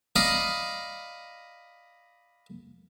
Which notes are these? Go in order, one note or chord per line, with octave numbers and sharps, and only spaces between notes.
D5 D#5 F5 A#5 B5